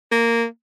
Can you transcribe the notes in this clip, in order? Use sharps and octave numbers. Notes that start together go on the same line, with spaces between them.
A#3